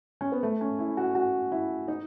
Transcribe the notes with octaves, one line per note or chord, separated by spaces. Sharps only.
C#4
B3
A3
C#4
E4
F#4
F#4
E4
D#4